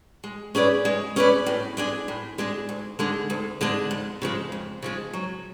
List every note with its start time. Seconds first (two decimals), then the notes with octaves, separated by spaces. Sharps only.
0.24 G#3
0.55 C#4 G#4 B4 D5
0.85 G#3
1.16 C#4 G#4 B4 D5
1.46 A2
1.77 G#3 D4 G#4
2.08 A2
2.38 G#3 D4 G#4
2.69 D2
2.99 D3 G#3 D4
3.30 D2
3.61 D3 G#3 D4
3.91 F2
4.22 C#3 F3 G#3
4.52 F2
4.82 C#3 F3 G#3
5.13 F#3